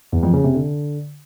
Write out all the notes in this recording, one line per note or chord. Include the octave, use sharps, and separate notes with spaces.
E2
F2
C#3
C3
D3